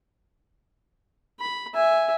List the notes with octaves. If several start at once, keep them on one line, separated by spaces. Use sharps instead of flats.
B5
E5 G#5